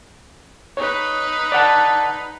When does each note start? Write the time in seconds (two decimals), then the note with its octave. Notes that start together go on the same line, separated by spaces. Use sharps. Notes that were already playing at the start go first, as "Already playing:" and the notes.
0.77 D#4 B4 C#5
1.52 D5 F#5 A5